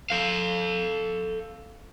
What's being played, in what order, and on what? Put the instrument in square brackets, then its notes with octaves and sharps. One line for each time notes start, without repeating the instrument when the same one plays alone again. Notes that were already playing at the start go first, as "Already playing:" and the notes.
[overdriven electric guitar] A4 F5